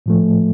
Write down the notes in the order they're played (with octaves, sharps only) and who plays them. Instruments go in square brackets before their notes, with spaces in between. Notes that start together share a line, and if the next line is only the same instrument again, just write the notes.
[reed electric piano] A2 F3 A3